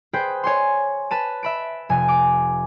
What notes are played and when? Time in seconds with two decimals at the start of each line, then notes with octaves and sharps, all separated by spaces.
0.13 G#4 B4 C5 G5
0.44 C#5 G#5 C6
1.11 B4 A5 D#7
1.43 E5 B5 D7
1.89 F1 G#5
2.08 D6